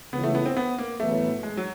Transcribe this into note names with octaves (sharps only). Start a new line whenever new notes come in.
C#2 C#3 E3 B3
A3
B3
C4
B3
A#3
A1 A2 F#3 A3 B3
G#3
F#3